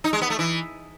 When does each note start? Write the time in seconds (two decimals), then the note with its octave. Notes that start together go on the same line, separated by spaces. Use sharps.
0.04 D#4
0.13 G#3
0.22 B3
0.30 A3
0.39 E3